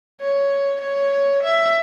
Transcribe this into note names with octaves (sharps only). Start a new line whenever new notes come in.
C#5
C#5
E5